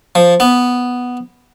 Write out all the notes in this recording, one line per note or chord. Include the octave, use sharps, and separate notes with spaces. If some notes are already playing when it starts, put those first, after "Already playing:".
F3
B3